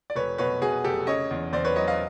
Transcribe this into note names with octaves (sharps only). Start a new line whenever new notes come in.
D5
F1 B4 C#5
B2 B4 C#5
B2 F#4 G#4
F1 G4 A4
C#3 C#5 D#5
E2
E2 C5 D5
B4 C#5
F#3 C#5 D#5
D#5 F5